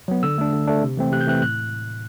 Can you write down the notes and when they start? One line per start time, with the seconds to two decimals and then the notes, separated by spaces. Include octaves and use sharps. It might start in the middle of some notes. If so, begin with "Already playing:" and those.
0.08 F#3 B3
0.23 D3 E6
0.38 A3 D4
0.53 D3
0.68 A3 D4
0.83 C3
0.97 E3 A3 C4
1.12 C3 F#6
1.21 G6
1.27 E3 A3 C4 F#6
1.42 A2 F#6